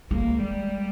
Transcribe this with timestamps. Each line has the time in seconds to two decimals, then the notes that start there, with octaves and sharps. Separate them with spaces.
0.10 G#3 A#3
0.43 G3